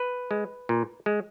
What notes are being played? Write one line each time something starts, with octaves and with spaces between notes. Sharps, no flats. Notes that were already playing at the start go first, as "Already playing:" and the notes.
Already playing: B4
G#3
A#2
G#3